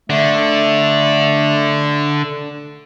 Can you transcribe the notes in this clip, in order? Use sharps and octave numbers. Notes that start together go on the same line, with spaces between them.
D3 A3